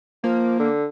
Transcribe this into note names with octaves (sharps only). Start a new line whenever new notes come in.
F3 A#3
D3